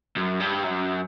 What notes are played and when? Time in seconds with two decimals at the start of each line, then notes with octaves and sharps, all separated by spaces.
0.16 F#2
0.40 G2
0.64 F#2